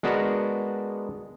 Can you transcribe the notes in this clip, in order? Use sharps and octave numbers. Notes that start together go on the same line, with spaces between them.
G#3 B3 D4 F#4 A#4